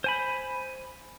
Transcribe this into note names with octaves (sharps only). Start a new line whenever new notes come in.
C5 G#5 B5